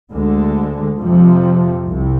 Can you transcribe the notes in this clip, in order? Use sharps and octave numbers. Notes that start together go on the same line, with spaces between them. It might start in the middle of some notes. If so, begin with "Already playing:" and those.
D2 D3 G#3
F2 C3 F3
C2 C3